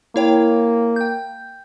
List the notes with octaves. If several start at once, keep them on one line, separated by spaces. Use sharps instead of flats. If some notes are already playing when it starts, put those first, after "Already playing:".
A#3 E4 C#5 G5
G5 G6